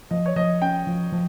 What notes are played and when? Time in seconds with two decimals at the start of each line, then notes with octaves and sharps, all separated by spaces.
0.11 F3 D#5
0.26 C#5
0.36 F3 D#5
0.62 C#4 G5
0.87 F3
1.12 F3